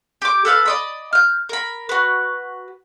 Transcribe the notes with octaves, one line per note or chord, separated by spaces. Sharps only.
G4 D6
A4 B4 F5 A5
D5 D#5 B5
F6 G6
A#4 B5
F#4 B4